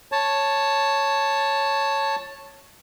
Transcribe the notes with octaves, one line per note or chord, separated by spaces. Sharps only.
C#5 A5